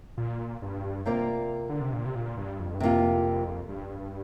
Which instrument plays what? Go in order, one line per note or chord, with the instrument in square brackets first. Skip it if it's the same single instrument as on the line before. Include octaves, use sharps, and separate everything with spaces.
[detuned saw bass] A#2
G2
[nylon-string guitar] C3 A#3 F4 A#4 D5
[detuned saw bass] D3
C3
A#2
C3
A#2
G2
F2
G2
[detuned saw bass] F2 [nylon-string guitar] C3 A#3 F4
[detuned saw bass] G2